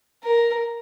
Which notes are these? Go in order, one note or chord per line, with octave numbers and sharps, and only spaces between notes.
A#4